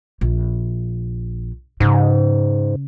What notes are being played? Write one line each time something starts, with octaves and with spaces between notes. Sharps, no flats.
A#1
G#2 C#3